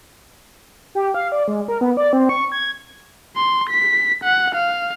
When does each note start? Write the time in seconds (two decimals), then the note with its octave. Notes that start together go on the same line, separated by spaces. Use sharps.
0.95 G4
1.14 F5
1.32 D5
1.48 G#3
1.68 A#4
1.81 B3
1.97 D5
2.13 C4
2.29 C#6
2.52 G#6
3.36 C6
3.70 B6
4.24 F#5
4.55 F5